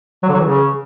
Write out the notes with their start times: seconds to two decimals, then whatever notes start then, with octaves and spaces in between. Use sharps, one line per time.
0.23 F#3
0.29 D3
0.34 F#3
0.40 E3
0.45 C#3